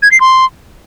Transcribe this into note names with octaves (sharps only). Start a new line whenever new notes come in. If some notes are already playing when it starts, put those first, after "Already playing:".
G#6
C7
C6